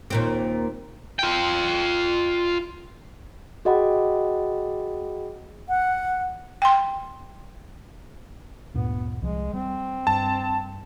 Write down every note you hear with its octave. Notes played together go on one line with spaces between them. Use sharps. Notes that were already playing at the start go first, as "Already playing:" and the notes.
D#2 A#2 C4
F4 G5
F#4 G#4 D#5 F#5 G5 B5
F#5
G5 C6
D2 G2 A#2 B3
C2 F3 G#3
G3 C4
G2 A5